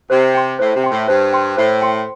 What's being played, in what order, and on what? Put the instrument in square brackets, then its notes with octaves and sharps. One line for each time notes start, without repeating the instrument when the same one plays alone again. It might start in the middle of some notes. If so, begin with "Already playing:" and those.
[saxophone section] C3 [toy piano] C5
[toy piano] G5 C6
[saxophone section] A2 [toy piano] C5
[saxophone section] C3
[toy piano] G5 C6
[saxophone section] A2
[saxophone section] G2 [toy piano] C5
[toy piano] G5 C6
[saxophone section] A2 [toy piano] C5
[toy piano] G5 C6